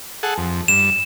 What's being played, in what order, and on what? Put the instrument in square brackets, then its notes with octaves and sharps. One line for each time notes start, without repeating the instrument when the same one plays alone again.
[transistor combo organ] G#4 A4 F#5
F2
[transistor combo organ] G2 [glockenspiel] E7